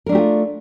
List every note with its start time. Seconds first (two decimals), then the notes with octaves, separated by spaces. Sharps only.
0.06 A#4
0.09 D4
0.12 A3
0.15 G4
0.18 F4